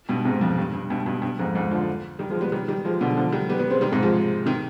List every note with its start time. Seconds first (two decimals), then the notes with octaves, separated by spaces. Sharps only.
0.09 G2 B2
0.25 G#2 C3
0.41 F2
0.58 G2
0.73 G2
0.90 G2 B2
1.06 G2 B2
1.22 G2
1.39 F2 G#2
1.55 F2 G#2
1.71 D3 F3
2.19 D#3 G3
2.30 F3 G#3
2.41 G3 B3
2.52 D#3 G3
2.68 D#3 G3
2.85 F3 G#3
3.01 B2 D3
3.17 D3 F3
3.32 D#3 G3
3.49 G3 B3
3.59 G3 B3
3.70 G#3 C4
3.81 D#3 G3
3.92 G#2 C3
4.03 F3 G#3
4.46 C3 D#3